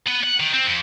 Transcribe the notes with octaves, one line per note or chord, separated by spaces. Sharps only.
B3
F#5
D#3
C4
F2